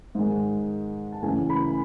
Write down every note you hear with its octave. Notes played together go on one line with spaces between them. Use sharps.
G#2 D#3 G#3
A5
C#3 E3 A3 C#4 G#5
B5